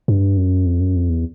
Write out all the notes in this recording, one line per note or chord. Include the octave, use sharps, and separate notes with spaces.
G2
F#2
F2
F#2
F2
E2